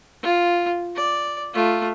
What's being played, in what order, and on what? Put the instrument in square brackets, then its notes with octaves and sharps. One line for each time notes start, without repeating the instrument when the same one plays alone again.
[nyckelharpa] F4
D5
A3 F4